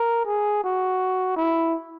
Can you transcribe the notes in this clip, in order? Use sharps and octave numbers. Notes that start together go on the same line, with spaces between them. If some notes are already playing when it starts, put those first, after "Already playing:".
Already playing: A#4
G#4
F#4
E4